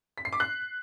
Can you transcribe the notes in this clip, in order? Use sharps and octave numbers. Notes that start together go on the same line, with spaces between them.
B6
C7
D6
F#6